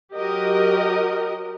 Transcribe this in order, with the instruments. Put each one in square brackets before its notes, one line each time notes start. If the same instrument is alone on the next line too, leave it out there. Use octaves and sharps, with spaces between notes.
[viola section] F#3 F#4 G4 A#4 D#5